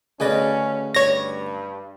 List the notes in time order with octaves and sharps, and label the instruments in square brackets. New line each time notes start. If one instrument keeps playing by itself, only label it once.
[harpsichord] D2 C#3 B4 [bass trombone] C#4 [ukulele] G#4 D5 D#5
[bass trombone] G2 [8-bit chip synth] C#5 A#6